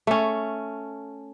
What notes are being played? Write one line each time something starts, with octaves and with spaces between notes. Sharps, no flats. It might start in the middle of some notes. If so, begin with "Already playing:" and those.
A3 C#4